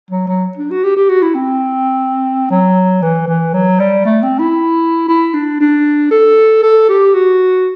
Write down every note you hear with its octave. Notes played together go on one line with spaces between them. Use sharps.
F#3
F#3
D4
F#4
G4
G4
F#4
E4
C4
F#3
E3
E3
F#3
G3
A3
C4
E4
E4
D4
D4
A4
A4
G4
F#4